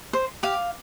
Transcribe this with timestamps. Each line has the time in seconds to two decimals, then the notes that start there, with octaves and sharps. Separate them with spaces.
0.13 C5
0.43 G4 F5